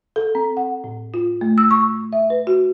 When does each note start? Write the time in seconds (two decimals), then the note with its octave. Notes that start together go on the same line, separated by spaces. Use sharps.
0.16 A4
0.35 C4
0.57 F#5
0.84 A2
1.14 F4
1.41 A3
1.58 E6
1.71 C#6
2.13 E5
2.30 B4
2.47 F#4